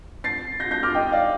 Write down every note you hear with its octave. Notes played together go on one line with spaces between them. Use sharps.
A6 C7
G6 A#6
G6 A#6
D6 F6
D#5 G5
D5 F5